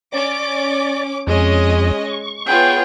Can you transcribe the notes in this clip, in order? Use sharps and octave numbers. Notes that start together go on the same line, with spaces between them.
C#4 D5 D6
F2 G#3 C#4 D#5
C#6
B3 F4 G#4 C#5 G5